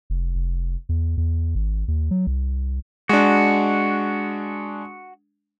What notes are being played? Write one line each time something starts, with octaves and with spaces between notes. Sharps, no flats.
F1
F1
E2
E2
G#1
D#2
F#3
C2
G#3 D4 F#4